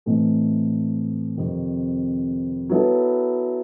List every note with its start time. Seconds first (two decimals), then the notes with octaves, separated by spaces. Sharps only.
0.06 A2 E3 A3 C4 D#4
1.38 F2 C3 D#3
2.70 F#3 B3 E4 A4